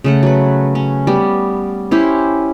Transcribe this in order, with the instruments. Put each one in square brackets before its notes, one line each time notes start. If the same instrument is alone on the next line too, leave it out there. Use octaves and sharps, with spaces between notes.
[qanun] C#3 A3 F#5
F#3 B4
C#4
G3 B3
C#4 E4 G4 C5